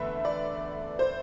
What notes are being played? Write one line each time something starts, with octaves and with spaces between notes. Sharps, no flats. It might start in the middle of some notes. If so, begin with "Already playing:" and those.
Already playing: E2 D3 A3 B4 E5
D5
C5